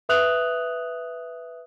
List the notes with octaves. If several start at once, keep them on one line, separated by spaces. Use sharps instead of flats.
B4 E5 D#6 F#6 F7 F#7